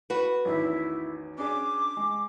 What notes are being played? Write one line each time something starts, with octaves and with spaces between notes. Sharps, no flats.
F#4 B4
A1 E2 D#3 E4
C#4 D4 G#4 D6
G#3